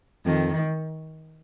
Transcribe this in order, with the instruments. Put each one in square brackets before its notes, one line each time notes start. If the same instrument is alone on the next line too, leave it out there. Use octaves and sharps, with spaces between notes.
[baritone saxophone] F2 [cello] D#3